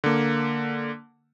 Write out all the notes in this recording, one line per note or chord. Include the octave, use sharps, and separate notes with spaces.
D3 A#3